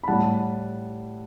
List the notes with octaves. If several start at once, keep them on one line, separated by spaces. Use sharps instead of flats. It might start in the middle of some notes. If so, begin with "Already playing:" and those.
B5
A2 G3 F#5 A5